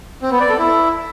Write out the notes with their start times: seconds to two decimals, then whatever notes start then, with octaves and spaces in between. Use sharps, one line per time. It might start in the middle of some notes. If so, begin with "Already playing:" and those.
0.22 C4
0.31 B3
0.40 D5
0.49 A4
0.58 E4